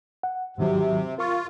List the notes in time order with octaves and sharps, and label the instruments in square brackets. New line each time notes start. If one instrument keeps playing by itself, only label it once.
[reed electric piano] F#5
[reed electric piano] G#2 D#3 F#3 [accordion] C3
[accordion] F4 [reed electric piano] A#4 C#6